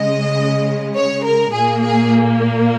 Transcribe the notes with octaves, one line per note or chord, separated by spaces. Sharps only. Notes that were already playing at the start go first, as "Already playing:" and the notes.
Already playing: C#3 G#3 D#5
C#5
A#4
A#2 A#3 G#4
G#4